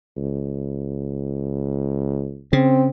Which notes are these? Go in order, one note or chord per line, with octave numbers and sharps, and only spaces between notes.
C#2
C#3 C4